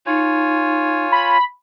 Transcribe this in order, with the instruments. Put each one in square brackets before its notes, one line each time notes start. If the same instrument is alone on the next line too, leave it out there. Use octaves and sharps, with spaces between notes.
[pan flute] D#4 [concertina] F4 C#5 G#5
[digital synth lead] B5